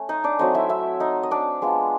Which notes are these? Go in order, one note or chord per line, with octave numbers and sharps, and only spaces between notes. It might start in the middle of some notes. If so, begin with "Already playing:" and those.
Already playing: A3 C#4
D#4 D#5
D4 D5
F#3 A3 C4 D#4 D#5
E4 E5
E4 E5
D#4 D#5
D#5
D4 D5
G#3 B3 D4 F4